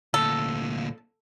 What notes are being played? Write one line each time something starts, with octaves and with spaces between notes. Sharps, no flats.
D2 A#2 A4